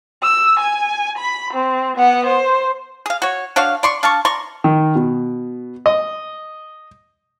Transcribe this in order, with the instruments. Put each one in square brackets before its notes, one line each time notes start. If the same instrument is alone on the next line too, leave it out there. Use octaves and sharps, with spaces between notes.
[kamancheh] E6
G#5
B5
C4
B3 F#5
C5
[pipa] G#4 F5
F#4 C#5
D4 F#4 C#5 F5
D5 C6 C#6
D4 F5 A5 C#6
D5 A#5 C6 C#6
[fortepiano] D#3
B2
D#5